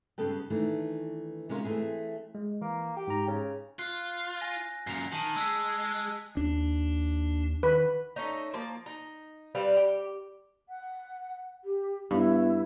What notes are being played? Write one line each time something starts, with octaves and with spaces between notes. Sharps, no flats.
G2 C#3 B3 A4 G5
D#3 E3 A3 D4
C3 G#3 C#4 F4 A#4
E3 A3 C4 E4 G#4
G#3
E3 A#3
G4
G#2 A#5
C#3
F4 F#6
G#5 A#6
F#2 A#2 C7 F7
D#3 A5 D#7
G#3 E6 B6
D#2 D4
D#3 B4
A3 C#4 D#4
F3 A#3 A5
D#4
G3 C4 B4 F5
G4
F#5
G4
G2 B3 E4